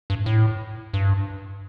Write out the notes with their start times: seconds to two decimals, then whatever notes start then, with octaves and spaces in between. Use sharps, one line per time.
0.10 G2
0.26 A2
0.94 G2